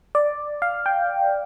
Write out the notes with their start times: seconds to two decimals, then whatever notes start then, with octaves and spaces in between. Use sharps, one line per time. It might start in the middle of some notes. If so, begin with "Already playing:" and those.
0.15 D5
0.62 F5
0.86 G5